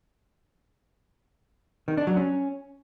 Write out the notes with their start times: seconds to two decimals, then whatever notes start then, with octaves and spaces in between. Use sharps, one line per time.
1.88 D#3
1.97 D4
2.07 F#3
2.17 C#4